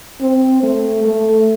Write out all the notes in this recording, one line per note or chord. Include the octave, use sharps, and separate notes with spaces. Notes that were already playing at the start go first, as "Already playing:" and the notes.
C4
A3
A3